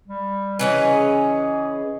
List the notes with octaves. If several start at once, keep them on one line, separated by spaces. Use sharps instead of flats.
G3
C#3 E3 C#4 B4 D#5
G#4